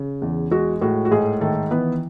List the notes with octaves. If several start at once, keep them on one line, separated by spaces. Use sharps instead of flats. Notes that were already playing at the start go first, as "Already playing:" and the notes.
Already playing: C#3
E2
G#3 F#4
A2 F#4
F#4
G#2 G#4
D#3 A3 A4
E3 B3 B4